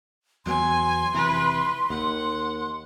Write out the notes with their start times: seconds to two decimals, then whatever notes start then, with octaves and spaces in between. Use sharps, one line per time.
0.46 E2 F#3 B3 G#5 C6
1.14 F1 C3 E3 B4
1.90 D#2 F#5